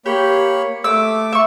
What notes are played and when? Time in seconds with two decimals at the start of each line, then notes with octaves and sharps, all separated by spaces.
0.06 A#3 G4 C#5 B5
0.84 A3 D6 E6
1.32 E5 C#6